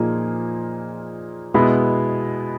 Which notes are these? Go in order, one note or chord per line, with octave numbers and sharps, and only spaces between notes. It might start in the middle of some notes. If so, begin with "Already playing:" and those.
Already playing: A#2 F3 A#3 D#4 G#4
B2 G#3 B3 E4